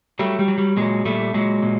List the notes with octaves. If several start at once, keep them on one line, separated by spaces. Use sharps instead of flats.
F#3 G3 A3
G3
F#3
G3
A#2 F#3 G#3
A#2 G3 A3
A#2 F#3 G#3
A#2